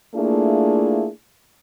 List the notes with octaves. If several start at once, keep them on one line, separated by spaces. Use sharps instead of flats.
A3 A#3 D4 E4 F4 G#4